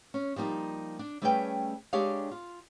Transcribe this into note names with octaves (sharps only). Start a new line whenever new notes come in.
C#4
F3 G3 A#3 D#4
D4 D5
G3 A3 C#4 G#4 B4 G5
G#3 D4 G4 G#4 C#5 F5
F4